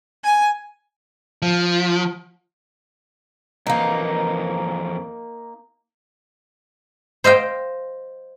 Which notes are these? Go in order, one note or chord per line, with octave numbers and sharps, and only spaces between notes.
G#5
F3
F2 E3 A#3 D#4 D#5
C5 D#5 F5 G5